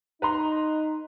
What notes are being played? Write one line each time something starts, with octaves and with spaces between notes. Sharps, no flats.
D#4 B4 A#5 C6